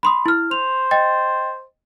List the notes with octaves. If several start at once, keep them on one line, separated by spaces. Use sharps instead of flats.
B5 C6 D#6
E4 F6
C5 F7
D#5 G5 A6